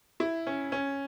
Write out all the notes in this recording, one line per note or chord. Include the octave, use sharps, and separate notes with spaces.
E4
C#4
C#4